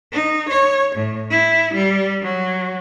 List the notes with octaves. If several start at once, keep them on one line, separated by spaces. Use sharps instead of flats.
D#4
C#5
A2
E4
G3
F#3